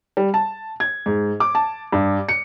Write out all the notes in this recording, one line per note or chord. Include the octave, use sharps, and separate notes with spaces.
G3
A5
G#6
G#2
D6
A5
G2
C#7